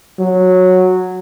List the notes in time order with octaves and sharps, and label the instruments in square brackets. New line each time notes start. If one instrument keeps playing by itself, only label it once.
[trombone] F#3